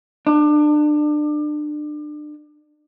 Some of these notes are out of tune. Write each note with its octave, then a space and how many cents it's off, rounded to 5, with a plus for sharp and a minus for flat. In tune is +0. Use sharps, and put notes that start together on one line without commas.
D4 +30